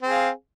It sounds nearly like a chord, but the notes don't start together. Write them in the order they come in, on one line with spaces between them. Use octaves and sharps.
C4 G#4 F5